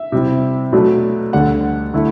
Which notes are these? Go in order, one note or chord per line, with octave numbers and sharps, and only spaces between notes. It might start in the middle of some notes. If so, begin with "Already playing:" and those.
Already playing: E5
C3 G3 C4 E4
B2 F#3 A3 D4
D2 D3 G3 D4 F#5
D3 A3 E4